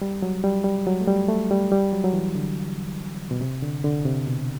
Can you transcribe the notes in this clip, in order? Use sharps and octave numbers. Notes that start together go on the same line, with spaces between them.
G3
F#3
G3
G3
F#3
A3
G3
A3
G3
G3
F#3
F#3
E3
D3
B2
C3
D3
D3
C3
B2